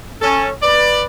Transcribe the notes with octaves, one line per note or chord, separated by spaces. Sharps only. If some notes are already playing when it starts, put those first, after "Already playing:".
C#4 A4
B4 D5